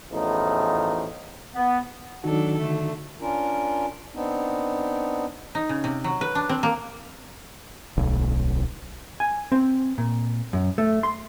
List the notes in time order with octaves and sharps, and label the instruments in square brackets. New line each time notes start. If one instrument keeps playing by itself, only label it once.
[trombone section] A1 E2 A2 F3 D#4
[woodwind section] B3
[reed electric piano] D#3 D#4 F#4 [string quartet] F#3 D4 A4
[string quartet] D3 A3
[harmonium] C#4 D4 F4 A#4
B3 C4 D4 D#4
[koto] D#4
C#3
C3
F#3
B4
D4
C4
A#3
[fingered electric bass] D1 B1
[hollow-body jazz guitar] G#5
C4
A#2
F#2
A3
C6